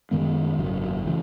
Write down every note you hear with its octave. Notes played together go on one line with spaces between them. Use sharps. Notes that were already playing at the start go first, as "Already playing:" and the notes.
F#2 D#3 G#3 B3
G#1 F#2 C#3 F#3
C#3 E3 A3